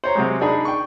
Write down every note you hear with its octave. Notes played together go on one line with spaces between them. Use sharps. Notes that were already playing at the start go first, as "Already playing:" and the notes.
C5 C#5 A#5
C3 F#3 G#3
D4 D#4 G#4 D5 G#5 B5
G5 C#6